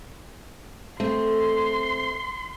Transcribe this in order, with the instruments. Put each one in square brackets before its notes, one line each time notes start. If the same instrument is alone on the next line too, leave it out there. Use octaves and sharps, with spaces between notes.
[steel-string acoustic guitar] A3 C4 [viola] C6